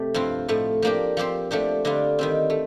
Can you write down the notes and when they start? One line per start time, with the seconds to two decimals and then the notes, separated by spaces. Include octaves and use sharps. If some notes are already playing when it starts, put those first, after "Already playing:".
Already playing: C3 A3 G4
0.14 G2 F3 C4 F4
0.48 A2 F3 A3
0.82 F3 A#3 D4 G4
1.17 F3 C4 G4 C5
1.51 F3 A3 D4 G4
1.85 D3 G3 D4 F4
2.19 D#3 G3 C4
2.50 A3